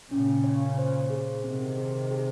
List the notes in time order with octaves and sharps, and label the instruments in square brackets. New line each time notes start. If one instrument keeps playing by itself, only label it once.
[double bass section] A#2 C#3 [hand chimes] C#4
[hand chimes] C#5
C5
G#4
[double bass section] C3 D#3 [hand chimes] C4
[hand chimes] G#4
G#4